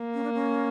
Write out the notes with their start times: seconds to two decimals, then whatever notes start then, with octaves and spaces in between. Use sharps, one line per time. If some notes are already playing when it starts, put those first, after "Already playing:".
Already playing: A#3
0.14 C#4
0.24 D4
0.34 C#4